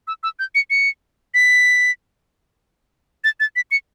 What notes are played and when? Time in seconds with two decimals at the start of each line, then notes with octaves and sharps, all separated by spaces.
0.07 E6
0.23 E6
0.39 G6
0.55 C#7
0.70 C#7
1.34 B6
3.24 A6
3.40 A6
3.56 B6
3.71 C#7